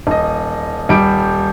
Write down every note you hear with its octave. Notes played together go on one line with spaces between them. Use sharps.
D#1 D#5
D#1 G3 D7